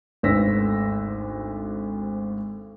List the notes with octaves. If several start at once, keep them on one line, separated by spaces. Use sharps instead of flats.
G#1 D2 C5 E6 A#6 B6